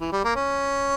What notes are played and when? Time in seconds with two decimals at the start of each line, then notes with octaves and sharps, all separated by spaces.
0.01 E3
0.12 G3
0.24 A#3
0.36 C#4